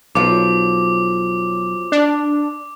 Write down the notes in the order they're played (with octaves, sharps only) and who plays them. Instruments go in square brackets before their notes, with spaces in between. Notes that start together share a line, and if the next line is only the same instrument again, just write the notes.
[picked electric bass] B1 [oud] F3 F#3 F4 [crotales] D6
[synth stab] D4